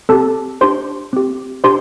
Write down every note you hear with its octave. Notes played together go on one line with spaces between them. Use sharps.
C4 G4 A4 A5
D4 G4 C5 C6
C4 G4
D4 G4 C5 C6